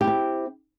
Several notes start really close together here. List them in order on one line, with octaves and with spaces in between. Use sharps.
G4 E4 C4